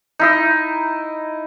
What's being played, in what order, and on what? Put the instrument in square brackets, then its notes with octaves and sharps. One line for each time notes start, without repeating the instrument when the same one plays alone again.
[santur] D#4 E4 D#5